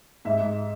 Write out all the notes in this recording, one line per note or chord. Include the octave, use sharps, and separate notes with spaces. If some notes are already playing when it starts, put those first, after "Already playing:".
G#2 E5
G#2